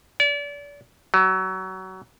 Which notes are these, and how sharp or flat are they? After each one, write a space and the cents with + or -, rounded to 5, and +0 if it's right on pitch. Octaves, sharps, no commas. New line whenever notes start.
D5 -35
F#3 +25